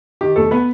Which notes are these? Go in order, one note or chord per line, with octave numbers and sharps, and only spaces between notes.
D#3 G4
E1 A3 A4
B3 B4